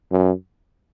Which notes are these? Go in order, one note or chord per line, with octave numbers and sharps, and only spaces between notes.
F#2